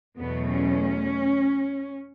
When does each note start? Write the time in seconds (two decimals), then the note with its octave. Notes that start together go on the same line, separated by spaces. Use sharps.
0.18 E2 B2 F#3 A3 B3
0.50 C#4